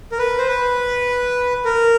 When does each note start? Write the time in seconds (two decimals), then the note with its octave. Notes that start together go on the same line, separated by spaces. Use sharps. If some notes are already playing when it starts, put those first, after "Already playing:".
0.12 A#4
0.19 B4
0.38 C5
0.48 B4
1.65 A#4